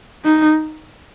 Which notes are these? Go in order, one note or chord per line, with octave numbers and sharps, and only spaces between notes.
D#4